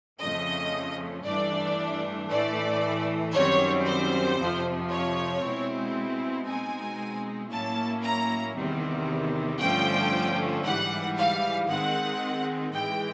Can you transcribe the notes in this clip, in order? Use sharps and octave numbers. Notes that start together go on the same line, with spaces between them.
F2 C#3 F3 A3 C#4 D#5
G2 E3 A3 D4 D5
A2 E3 A3 D5
F#2 D#3 G3 C4 C#5
C5
F2 C3 F3
C#5
B2 G#3 C4 E4
B2 G#3 C4 D#4 G#5
A2 F#3 A#3 C#4 E4 A5
A#5
E2 C3 D#3 G3 C4
G2 D3 F3 A3 C#4 G5
G#2 E3 G3 F#5
F5
D#3 G#3 C4 D#4 F#5
A2 E3 G#3 G5